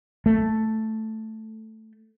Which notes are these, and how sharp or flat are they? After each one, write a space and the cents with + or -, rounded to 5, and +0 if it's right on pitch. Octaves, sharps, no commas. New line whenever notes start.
A3 +0